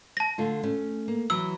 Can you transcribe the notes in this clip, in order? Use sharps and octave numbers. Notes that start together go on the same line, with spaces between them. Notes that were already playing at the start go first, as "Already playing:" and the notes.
A5 A#6
D3 A3 F4
A3 C#4
A#3
E3 F#3 E6